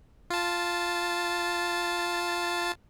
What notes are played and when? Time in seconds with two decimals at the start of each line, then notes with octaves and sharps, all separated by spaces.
0.30 F4 A5